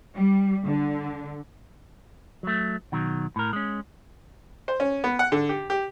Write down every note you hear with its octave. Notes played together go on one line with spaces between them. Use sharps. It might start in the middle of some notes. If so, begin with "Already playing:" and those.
G3
D3
F#3 A3
B2 D#3 F#3
A2 A#4
G#3 C#4
C5
C#4
B3
F#5
D3
G4
G4